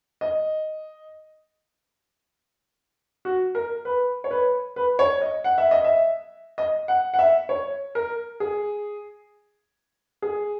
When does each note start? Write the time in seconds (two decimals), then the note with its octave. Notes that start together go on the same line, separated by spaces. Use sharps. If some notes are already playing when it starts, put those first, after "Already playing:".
0.21 D#5
3.25 F#4
3.55 A#4
3.85 B4
4.24 C#5
4.31 B4
4.76 B4
4.99 C#5
5.22 D#5
5.44 F#5
5.58 E5
5.71 D#5
5.84 E5
6.58 D#5
6.88 F#5
7.14 F#5
7.19 E5
7.49 C#5
7.95 A#4
8.40 G#4
10.22 G#4